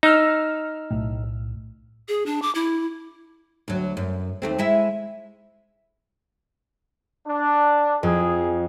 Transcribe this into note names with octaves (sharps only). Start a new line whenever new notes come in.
D#4 E6 F6
B1 A2
G#4
D4
D6
E4
D2 F#3
F#2
D#2 A3 C4
G#3 E4 E5
D4
F2 G#4